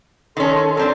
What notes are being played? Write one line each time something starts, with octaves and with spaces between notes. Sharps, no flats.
D#3 C#4 A4 C6
F#3 C4 D4